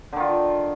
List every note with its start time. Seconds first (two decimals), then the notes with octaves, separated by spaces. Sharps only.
0.13 D3
0.16 D#3
0.20 F4